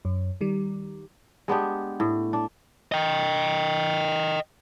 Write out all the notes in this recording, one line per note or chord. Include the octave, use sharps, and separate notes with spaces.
F#2
D#3 G3
G#3 B3 D4 G4
A2
D4
D#5 G5